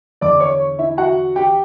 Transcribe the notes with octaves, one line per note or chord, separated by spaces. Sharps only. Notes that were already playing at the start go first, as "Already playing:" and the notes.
E2 D3 D5 D6
C#5 C#6
E4 E5
F#4 F#5
G4 G5